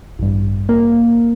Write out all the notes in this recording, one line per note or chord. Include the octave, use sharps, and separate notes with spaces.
A1 G2
A#3